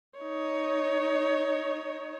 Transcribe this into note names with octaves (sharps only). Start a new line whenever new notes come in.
D#4 C#5